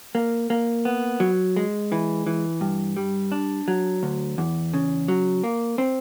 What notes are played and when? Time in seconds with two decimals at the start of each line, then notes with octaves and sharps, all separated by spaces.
0.15 A#3
0.50 A#3
0.85 B3
1.20 F#3
1.56 G#3
1.92 E3
2.27 E3
2.61 G2
2.97 G3
3.32 D4
3.68 F#3
4.03 D2
4.38 E2
4.74 C#3
5.08 F#3
5.43 A#3
5.78 C4